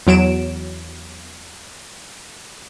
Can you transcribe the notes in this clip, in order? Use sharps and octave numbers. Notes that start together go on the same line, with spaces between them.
E2 F#3 D7 E7